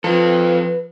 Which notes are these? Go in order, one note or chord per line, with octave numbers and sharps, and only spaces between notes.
F3 F4 A4 B4